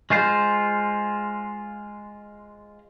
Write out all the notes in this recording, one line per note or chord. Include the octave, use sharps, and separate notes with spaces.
G#3 F4 C5